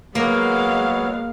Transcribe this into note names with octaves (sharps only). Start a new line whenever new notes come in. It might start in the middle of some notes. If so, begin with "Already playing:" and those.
F#3 G#3 A#3 B3 F5